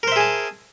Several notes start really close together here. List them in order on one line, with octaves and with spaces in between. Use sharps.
A#4 C5 E5 G#4 A5